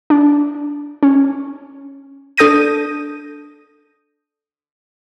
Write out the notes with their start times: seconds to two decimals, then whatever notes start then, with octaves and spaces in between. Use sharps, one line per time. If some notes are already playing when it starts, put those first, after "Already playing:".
0.10 D4
1.03 C#4
2.37 D4 A4 D#6 G6 A#6 D#7